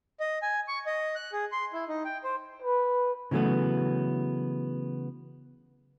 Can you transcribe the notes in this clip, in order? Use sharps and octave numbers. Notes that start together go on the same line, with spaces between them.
D#5
G#5
C#6
D#5
F#6
G#4
C6
E4
D#4
G5
C5
B4
C#3 E3 F#3 A3 B3